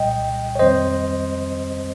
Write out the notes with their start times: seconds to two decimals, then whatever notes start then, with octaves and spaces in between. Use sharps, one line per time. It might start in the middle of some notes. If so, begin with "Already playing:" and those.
Already playing: C2 A#2 G3 D#5 G5
0.55 C#5
0.59 F2 D#3 G3 C4 C5 D#5